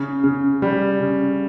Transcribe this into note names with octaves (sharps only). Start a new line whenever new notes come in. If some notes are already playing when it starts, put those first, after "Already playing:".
Already playing: C#3
C#3
G3
C#3